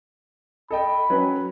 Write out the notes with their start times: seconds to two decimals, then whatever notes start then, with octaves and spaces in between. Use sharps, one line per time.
0.71 A4 D#5 G5 B5
1.10 F#3 C#4 B4